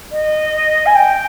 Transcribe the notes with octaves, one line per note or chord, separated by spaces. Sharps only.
D#5
G#5
G5